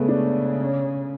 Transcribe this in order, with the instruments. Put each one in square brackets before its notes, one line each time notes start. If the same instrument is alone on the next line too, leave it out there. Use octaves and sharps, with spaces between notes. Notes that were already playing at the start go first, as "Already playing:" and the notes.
Already playing: [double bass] C#3 [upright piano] G#3 A3 B3
[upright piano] D4
C#4